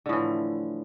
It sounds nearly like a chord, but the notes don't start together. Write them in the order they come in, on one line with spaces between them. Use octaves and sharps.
D3 A2 E3 F3